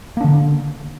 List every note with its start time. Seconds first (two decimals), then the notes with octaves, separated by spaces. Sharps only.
0.17 A#3
0.21 D4
0.24 D3